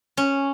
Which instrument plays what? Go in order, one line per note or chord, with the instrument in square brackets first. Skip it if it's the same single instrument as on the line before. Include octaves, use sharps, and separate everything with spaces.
[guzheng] C#4